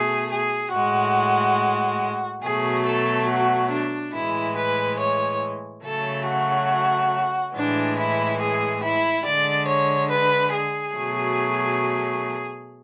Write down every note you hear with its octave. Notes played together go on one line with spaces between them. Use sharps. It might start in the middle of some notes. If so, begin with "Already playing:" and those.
Already playing: B2 A3 G#4
G#4
A2 G#3 F#4
B2 F#3 A3 G#4
A4
F#4
D4
A2 E3 G#3 E4
B4
C#5
C#3 F#3 A3 A4
F#4
A2 E3 G#3 D4
E4
G#4
E4
D3 G#3 D5
C#5
B4
G#4
B2 F#3 A3